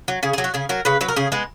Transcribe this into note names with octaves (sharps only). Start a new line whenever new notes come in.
F#3
C#3 G#4
G#4
F#3
F#4
C#3 G#4
F#3 A#4
C#3 B4
F#3 B4
A#4
C#3 G#4
G#3 B3